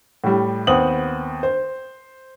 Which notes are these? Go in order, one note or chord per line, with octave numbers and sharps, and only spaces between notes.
A2 G3
D#2 B3 C4 D#6 F#7
C5